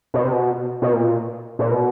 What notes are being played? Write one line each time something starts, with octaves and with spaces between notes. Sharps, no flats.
B2
C3
B2
B2
A#2
A#2
B2